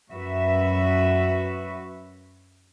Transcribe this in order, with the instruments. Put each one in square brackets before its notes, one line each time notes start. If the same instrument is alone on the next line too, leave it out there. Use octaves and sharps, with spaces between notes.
[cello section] F#2 F#4 B4 E5